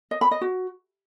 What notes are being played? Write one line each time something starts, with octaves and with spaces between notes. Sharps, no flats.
D#5
B5
D#5
F#4